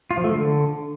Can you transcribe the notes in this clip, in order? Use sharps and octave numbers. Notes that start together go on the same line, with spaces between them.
F4
F3
A3
D3